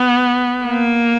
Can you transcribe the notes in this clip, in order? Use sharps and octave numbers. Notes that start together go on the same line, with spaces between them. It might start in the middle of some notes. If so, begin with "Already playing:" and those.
Already playing: B3
A#3